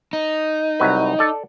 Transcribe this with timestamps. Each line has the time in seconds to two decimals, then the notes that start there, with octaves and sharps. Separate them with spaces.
0.13 D#4
0.80 C2 F#3 B4
1.19 A4 D5